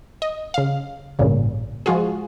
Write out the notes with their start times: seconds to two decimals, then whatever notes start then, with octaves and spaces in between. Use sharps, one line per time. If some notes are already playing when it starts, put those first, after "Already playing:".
0.22 D#5
0.54 C#3 F5
1.19 A1 G2 A#2 C#3
1.86 F3 G#3 F4 F#4 G#4